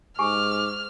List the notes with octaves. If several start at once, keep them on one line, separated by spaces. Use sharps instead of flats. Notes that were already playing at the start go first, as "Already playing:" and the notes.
G#2 G4 G#5 C#6 D6 F6